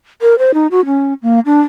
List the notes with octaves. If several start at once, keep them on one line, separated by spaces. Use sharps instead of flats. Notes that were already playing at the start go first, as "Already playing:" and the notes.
A#4
C5
D#4
F#4
C#4
A#3
D4